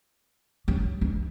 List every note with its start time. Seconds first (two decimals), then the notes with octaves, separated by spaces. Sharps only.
0.68 F#3
1.01 E3